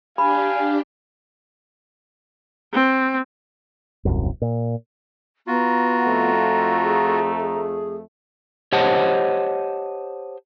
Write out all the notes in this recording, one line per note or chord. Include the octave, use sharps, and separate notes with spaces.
D4 G4 F5 G#5 B5
C4
D#1 C2 F#2
A#2
B3 F4 F#4 A#5
F2 A3
G#4
G#4
G4 C5 C#5 D#5 F#5 A5